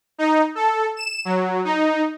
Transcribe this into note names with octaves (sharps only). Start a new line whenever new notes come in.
D#4
A4
E7
F#3
D#4